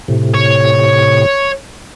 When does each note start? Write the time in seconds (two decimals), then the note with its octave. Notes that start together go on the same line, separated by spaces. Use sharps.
0.08 A2 C3
0.34 C#5